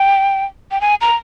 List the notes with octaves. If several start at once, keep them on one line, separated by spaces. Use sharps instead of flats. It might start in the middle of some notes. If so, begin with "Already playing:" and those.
Already playing: G5
G5
G#5
A#5